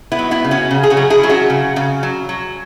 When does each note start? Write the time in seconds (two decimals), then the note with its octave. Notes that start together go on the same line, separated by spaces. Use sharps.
0.12 B3 E4
0.19 F#3
0.31 B3 E4
0.44 C#3
0.51 C#4 F#4
0.71 C#3
0.83 G#4
0.90 C#4 F#4
0.97 F#3
1.10 E4 G#4
1.23 F#3
1.30 C#4 F#4
1.50 C#3
1.76 C#3
2.03 F#3
2.29 F#3